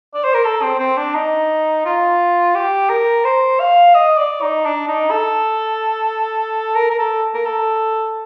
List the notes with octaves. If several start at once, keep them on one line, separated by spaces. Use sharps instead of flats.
D5
C5
A#4
A4
C4
C4
D4
D#4
F4
G4
A#4
C5
F5
D#5
D5
D#4
D4
D#4
A4
A#4
A#4
A4
A#4
A4